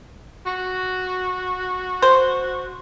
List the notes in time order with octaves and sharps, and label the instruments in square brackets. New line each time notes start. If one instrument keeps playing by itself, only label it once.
[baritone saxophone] F#4
[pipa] C5